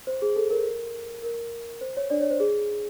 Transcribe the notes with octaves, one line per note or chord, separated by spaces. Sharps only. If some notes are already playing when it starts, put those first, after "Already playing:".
C5
G#4
A4
A#4
A#4
C5
C#5
D4 D5
C#5
C5
G#4